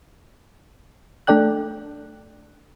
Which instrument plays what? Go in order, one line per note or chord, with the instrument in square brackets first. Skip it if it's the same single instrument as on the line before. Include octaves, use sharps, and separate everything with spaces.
[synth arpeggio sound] A3 D4 A4 D5 G5 F#6